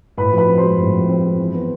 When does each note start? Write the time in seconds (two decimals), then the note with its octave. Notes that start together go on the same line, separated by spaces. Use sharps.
0.18 A2 B4 B5
0.32 F3
0.38 B4 B5
0.48 C4
0.58 C5 C6
0.63 G#3
0.78 A2
0.94 F3
1.08 C4
1.23 G#3
1.39 E3
1.54 B3